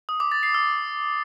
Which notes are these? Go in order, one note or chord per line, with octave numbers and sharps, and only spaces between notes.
D#6
D6
A6
C7
E6